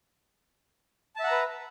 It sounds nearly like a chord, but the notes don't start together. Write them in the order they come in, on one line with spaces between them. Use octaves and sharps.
A5 E5 F#5 A#5 B4